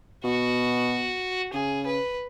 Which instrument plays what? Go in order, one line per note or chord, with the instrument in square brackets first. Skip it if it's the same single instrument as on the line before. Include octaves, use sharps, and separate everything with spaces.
[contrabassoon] B2 [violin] F#4
[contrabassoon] C#3 [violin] G#4
[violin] B4